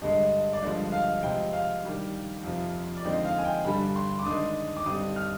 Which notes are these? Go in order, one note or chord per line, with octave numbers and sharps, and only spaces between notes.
G2 D3 G#3 D#5
D5
G2 D3 F3 G#3 D#5
F5
C3 F3 G#3 G5
F5
D#3 G3 D4
F2 C3 F3
D5
D3 F3 G#3 C4 D#4 D#5
F5
G#5
G5
G2 D3 G3 B5
C6
D6
D#3 G#3 D4 D#6
D6
G2 D3 G3 C4 D#4 D#6
F6